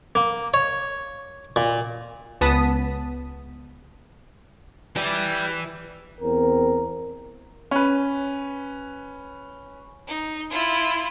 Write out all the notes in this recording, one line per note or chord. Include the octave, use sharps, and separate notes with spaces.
A#3
C#5
A#2
C#2 B3 A5 D#6 B6
E3 G4 D5
E2 C4 A#4
C#4 B4
D#4
E4 F4